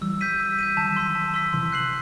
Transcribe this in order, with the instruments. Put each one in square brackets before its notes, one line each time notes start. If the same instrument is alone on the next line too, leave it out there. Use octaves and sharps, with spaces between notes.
[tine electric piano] E3 G3 [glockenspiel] E6
[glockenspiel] G6 B6 D#7
E6
G6 B6 D#7
[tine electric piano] D#3 F#3 [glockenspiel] A5
[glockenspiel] C6 E6 B6
A5
C6 E6 B6
[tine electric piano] C3 E3 [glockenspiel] C6
[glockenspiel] F#6 C7 F#7